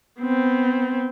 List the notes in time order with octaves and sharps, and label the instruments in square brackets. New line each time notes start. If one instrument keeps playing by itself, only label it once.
[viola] B3 C4